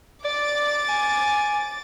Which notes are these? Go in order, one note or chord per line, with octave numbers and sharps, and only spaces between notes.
D5 D6 A6
G#5